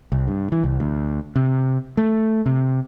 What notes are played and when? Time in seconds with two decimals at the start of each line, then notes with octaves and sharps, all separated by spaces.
0.12 C2
0.28 G2
0.52 E3
0.64 C2
0.80 D2
1.36 C3
1.97 A3
2.46 C3